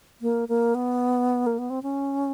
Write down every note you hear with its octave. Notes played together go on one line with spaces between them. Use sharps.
A#3
A#3
B3
A#3
B3
C4
C#4